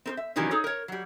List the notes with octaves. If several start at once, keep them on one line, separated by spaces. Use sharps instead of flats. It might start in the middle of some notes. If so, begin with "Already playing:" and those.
C4 A#4 C5
E5
C3 D#3 E3 F#3 G3 C#4
D#4 G#4 A4 C#5
A#4 C#5
F#3 G3